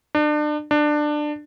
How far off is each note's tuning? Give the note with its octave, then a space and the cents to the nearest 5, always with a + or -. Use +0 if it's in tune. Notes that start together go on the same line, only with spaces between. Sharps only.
D4 +35
D4 +20